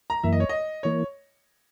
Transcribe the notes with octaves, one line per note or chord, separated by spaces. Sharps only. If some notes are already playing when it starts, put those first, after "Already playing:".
A#5
F#2 E3 A#3 E5
D#5
C#5
D#5
E3 A#3 C#5